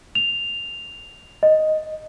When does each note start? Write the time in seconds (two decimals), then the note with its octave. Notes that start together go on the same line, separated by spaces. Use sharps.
0.15 F7
1.43 D#5